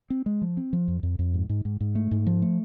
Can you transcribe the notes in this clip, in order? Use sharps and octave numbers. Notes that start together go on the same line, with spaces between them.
C4
G#3
F3
C4
F3
F2
F2
F2
G#2
G#2
G#2
G#2
A3
G#2
F3
A3